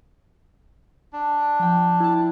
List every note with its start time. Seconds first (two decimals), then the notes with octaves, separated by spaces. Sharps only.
1.13 D4
1.60 F3 G5
2.00 E4 A5